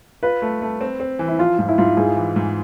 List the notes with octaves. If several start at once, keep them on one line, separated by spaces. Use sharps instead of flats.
F4 B4
A3
A3
C4
C4
E3
E4
F3 F4
G#2 F4
E4
G#2 F4
G#2 G#4
E3
G#2